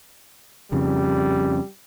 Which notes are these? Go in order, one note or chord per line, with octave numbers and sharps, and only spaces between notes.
F2 C#3 G3